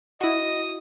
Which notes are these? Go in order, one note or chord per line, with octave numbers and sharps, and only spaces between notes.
E4 F#4 D#5 D#6